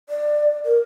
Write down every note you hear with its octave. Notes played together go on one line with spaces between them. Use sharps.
D5
A#4